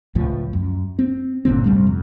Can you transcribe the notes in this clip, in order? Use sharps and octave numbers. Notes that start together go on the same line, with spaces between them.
C#2 A2 F3
F#2
C4
G1 A#2 D3 C4
C2 G#2 G3 A3
F2